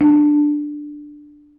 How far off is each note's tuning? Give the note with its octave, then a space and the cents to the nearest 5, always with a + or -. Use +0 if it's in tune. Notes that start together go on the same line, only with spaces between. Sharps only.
D4 +10